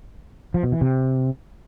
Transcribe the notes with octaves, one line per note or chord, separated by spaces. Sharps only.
F3
B2
E3
C3